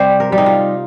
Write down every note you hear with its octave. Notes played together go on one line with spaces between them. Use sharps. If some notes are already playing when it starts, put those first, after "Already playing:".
Already playing: C3 G3 C5
A#4
G3
D#4
F4